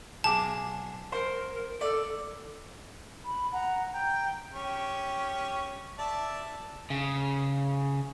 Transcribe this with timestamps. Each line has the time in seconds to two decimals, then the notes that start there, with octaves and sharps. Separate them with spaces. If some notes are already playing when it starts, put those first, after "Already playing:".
0.24 B1 G#4 A5 D6
1.12 A#4 C5 C6
1.81 A4 D5
3.25 B5
3.52 F#5 A#5
3.93 G5 A#5
4.54 C#4 G4 C#6
5.98 D5 E5 A5
6.90 C#3